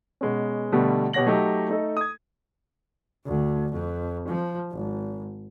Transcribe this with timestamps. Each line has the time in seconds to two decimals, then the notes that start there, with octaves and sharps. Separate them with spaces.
0.21 B2 G#3 B3 C#4
0.72 B2 D3 G3 A3 B3
1.13 B2 G4 C#5 F#5 A#6 F#7
1.26 F#3 A3 D#4 F#4 G4
1.69 A3 D#4 A4
1.97 D#6 G#6
3.25 D2
3.73 F2
4.28 F3
4.73 G#1